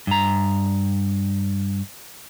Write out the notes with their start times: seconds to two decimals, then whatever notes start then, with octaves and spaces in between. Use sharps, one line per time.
0.07 G2 A#5